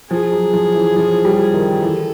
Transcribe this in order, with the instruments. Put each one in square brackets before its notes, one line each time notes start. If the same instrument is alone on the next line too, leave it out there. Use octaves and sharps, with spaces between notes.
[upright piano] F3 [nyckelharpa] G#4
[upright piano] F#3
F3
E3
F3
G3
D#3
[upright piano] E3 [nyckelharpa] A4